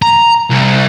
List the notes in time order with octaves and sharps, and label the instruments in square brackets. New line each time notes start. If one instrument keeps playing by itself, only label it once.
[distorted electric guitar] A#5
C2